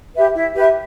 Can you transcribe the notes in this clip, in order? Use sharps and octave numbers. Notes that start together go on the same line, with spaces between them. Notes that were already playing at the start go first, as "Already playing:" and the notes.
G4 B4 E5
E4
G4 B4 E5